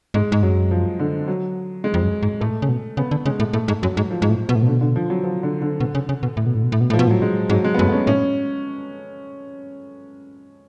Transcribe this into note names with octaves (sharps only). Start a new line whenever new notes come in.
G#2 G#3
G#2
F#2 F#3
F3
D3
F#3
G#3
F2
F#2
G#2
A2 A3
C#3
B2
C#3 B3
D3
C#3 G#3
A2
A2 A3
G#2
F#2 F#3
G#2
F3
G#2
A2
B2
A2
B2 D3
D3
F3
F#3
F3
D3
D3
B2
C#3
C#3
B2
A2
B2
A2
B2
A2
B2
A2 F3
B2
A2 F#3
G#3
G#2 F#3
G#3
B3
F#2 A3
B3
C#4
A2 C#4